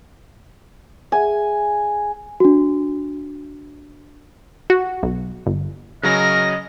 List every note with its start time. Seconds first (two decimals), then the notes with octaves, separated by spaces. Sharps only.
1.12 G#4 E5 F#5 G#5
2.40 D4 F#4
4.70 F#4
5.03 B1
5.46 G1
6.03 C#3 F#3 C#4 A#4 D#5 A#6